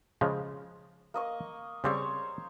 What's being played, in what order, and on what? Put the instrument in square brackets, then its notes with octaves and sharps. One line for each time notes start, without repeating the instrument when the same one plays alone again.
[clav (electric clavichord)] C#3 F3 G#3
[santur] A#3 D#5 C#6
[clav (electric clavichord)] C#3 G3 C4 [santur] C5 C#5 C#6